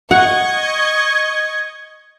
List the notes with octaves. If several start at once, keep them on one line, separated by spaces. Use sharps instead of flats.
D#5 F#5 C#6 G#6